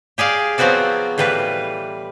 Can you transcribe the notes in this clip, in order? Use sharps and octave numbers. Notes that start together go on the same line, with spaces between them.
G4 G#4 D5 F5
F3 F#3 B3 C4 F#4 D5
A2 E3 G3 F4 B4